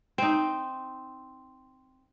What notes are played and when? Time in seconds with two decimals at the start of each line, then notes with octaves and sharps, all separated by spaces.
0.18 C4 D#4